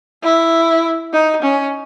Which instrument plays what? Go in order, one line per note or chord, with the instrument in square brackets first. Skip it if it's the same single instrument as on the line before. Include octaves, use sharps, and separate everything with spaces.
[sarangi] E4
D#4
C#4